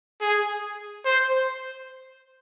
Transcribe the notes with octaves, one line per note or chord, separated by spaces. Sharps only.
G#4
C5